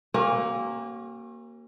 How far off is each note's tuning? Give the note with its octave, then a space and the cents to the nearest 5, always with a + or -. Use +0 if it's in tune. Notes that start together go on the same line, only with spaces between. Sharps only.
A#3 +0 C#4 -40 F#4 +40